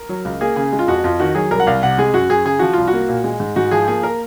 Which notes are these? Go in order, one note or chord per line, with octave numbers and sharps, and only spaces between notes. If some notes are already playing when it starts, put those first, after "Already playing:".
Already playing: A#4
F#3
C#2
A#3 G#4
C#3 G#4
G#3
F4
F2 F#4
F2 F4
D#3 F#4
F#3 G#4
C2 A#4
F#5
C2 F5
C3 F#5
G#3 G#4
F#2 F#4
F#2 G#4
C#3 G#4
F3 F#4
C2 F4
F#4
A#3
A#2
G#3
G#2
G#2 F#4
F3 G#4
A#3 G#4
A#4